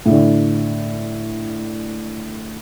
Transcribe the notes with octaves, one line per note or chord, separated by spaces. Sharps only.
A2 D3